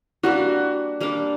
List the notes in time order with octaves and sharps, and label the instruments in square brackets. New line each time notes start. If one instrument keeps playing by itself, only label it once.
[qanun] G3 A#3 D4 [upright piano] F#4
[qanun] G3 A#3 D4